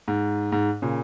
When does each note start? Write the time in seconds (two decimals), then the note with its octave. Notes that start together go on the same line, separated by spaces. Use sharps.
0.08 G#2
0.52 G#2
0.82 A#2 C#3